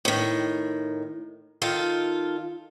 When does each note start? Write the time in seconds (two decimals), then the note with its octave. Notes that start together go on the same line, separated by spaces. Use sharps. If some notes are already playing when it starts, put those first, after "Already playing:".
0.05 A2 D#3
1.62 D#3 F4 A4